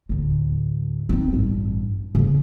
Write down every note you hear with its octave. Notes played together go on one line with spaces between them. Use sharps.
D2 A2
C4 D#4
A1 G2
C#3 F3